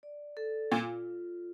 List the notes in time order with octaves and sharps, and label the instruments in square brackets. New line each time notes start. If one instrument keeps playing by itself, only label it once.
[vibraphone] D5
A4
[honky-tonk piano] A#2 [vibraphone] F4